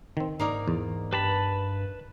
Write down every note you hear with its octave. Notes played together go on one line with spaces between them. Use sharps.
D#3 C4
G#2 A#3 D#4 D5
E2
G2 G4 B4 A5 B5